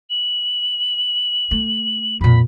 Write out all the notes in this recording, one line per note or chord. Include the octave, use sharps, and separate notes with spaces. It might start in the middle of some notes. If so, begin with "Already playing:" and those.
F#7
A3
F2 A#2 B5